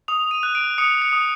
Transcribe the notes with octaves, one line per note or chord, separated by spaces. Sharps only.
D#6 F7
D#7
F#6
D7
D#6 C#7
C#7
D#6